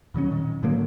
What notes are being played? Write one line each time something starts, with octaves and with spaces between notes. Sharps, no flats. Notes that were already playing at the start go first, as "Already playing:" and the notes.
A#2 D#3 F#3 C#4
D#3
A2 D3 F#3 A#3